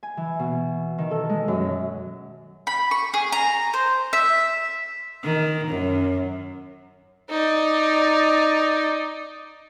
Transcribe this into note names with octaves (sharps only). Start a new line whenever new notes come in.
G#5
E3
B2
D#3
A4
G#3
F#2
B5
C#6
G#4
A#5
C5
E5
D#3
F#2
D#4 D5